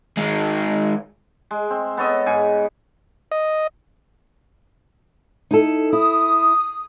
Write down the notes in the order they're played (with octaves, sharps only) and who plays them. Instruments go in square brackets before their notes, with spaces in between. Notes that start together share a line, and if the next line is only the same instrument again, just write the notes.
[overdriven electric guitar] D#3 G#3
[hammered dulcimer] G#3
C4
B3 A4 C#5 D#5
G#2 G#5
[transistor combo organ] D#5
[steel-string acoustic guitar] D#4 E4 A4
[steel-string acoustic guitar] E4 [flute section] D#6